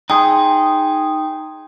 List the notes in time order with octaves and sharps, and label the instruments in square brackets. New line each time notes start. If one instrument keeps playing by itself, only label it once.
[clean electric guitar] D#4 G#4 [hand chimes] G5 C6